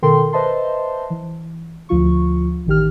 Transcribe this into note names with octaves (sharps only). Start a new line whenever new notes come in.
B2 D#3 A4 A#4 G5 C6
B4 C5 D#5 E5 A5 C6
E3
D2 F3 F4 C#6
A1 D#3 G4 F6